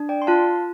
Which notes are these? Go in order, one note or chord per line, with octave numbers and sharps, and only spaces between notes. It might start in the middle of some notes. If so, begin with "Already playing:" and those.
Already playing: D4
D5 G5
C6
F4 F5 A5